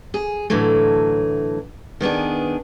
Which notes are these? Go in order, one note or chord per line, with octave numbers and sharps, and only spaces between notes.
G#4
A2 D3 E3 F#3 A3
D#3 B3 D4 G#4